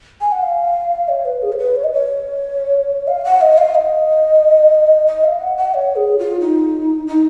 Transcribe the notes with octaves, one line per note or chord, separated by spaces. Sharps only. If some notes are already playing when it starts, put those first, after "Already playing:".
G#5
F#5
F5
C#5
B4
G#4
C#5
B4
C#5
D#5
C#5
F5
F#5
D#5
F5
D#5
D#5
F5
F#5
F#5
C#5
G#4
F4
D#4
D#4